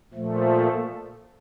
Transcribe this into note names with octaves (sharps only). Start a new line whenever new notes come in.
A#2 F3 A3